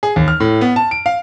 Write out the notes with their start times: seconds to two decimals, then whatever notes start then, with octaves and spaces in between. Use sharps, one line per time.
0.03 G#4
0.16 D#2
0.28 F6
0.40 A2
0.61 B3
0.76 A5
0.91 D7
1.06 F5